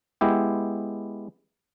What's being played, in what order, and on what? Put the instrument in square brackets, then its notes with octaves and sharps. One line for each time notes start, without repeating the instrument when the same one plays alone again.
[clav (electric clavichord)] G#3 B3 E4 G4